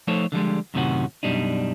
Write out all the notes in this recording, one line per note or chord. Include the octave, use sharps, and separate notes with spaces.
F3 A3 D#4 A4 C5 C#5
D3 F3 G3 G#3
F#2 A2 C3 D#3 C#4 F#4
F#2 B2 G3 D4 D#4